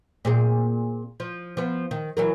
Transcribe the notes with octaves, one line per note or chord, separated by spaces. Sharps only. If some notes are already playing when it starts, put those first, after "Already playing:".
A#2 C4 G#4
F3
F3 B3
D#3
E3 F#3 A#4